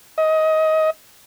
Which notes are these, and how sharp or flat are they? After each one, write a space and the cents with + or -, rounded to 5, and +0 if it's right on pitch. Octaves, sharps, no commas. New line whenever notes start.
D#5 +20